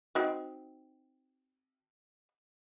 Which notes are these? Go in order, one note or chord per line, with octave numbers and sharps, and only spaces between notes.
C4 D#4 F#4